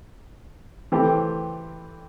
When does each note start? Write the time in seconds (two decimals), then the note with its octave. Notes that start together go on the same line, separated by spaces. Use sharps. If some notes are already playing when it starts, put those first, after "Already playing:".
0.92 E3 A3 C4 G4